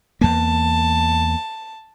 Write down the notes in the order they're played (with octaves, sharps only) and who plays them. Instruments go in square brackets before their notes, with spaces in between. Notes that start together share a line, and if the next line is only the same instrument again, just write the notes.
[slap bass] E2 A#3 [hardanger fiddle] A5